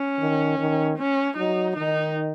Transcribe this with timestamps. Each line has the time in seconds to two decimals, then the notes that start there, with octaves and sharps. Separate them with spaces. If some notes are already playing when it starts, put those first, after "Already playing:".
Already playing: C#4
0.19 D#3
0.58 D#3
0.98 C#4
1.37 F#3 D#4
1.76 D#3 D#4